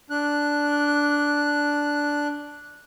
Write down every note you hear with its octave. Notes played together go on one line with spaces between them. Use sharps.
D4 F#6